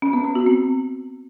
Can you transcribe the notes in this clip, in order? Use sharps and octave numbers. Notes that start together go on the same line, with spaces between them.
C#4
B3
B3
F#4
C4